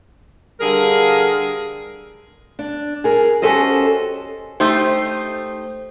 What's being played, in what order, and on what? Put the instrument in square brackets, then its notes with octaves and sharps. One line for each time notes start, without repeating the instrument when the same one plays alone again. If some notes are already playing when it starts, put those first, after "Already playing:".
[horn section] D3 G3 G#4 A#4 F5
[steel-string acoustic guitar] D4
G#4 A#4
C#4 F#4 G4 A4 C5 D#5
[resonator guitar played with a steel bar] A3 D#4 G4 C5